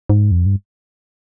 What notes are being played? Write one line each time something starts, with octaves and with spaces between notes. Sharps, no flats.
G#2
F2
G2